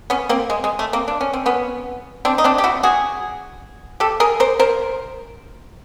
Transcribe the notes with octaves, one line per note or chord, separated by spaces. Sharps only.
B3 C#4
A#3 C4
G#3
G#3
A3
A#3 C4
D4
C#4
C4
B3 C#4
C4 D4
D#4
C4 D4
G4
E4 F#4
F#4 G#4
G4 A4
G#4 A#4
A#4 C5
A#4 C5